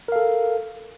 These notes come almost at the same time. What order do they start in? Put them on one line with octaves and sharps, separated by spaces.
A#4 F5 A4